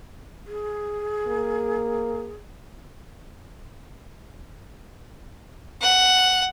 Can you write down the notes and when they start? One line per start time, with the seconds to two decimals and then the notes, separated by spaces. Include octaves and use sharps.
0.46 G#4
1.28 A#3
5.81 F#5